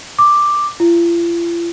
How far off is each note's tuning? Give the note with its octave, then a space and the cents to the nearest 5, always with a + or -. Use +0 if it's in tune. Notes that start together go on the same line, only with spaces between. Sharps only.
D6 +5
F4 -45